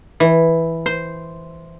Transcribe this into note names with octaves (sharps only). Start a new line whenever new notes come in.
E3
C5